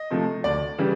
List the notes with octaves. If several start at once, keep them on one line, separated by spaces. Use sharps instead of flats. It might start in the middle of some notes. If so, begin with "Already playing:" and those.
Already playing: D#5
C3 F3 A3
D2 D5
C#3 E3 G3